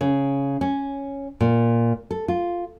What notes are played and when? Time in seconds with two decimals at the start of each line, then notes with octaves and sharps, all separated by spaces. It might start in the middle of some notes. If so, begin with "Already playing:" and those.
0.01 C#3
0.61 C#4
1.40 A#2
2.11 A4
2.28 F4